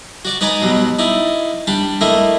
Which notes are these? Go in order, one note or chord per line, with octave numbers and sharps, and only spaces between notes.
F#4 D5 D6
D#4 B4 D5 G#5 A#5
B2 F#3 G3
D#4 E4 D5
G3 D4 G4
A3 A#3 E4 D#5